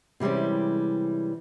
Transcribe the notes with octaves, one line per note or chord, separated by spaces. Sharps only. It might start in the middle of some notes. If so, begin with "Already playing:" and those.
C3 E3 G3 G#3 C#4